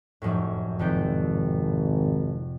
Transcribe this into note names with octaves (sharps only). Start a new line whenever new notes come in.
F1 F#2 A2
G#1 F2 C3 G5